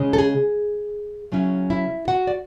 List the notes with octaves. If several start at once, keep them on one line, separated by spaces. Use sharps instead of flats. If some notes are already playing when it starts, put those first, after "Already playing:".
Already playing: C#3 G#3 C#4
A4
G#4
C#3 F#3 C#4 E4
E4 E5
F#4 F#5
D5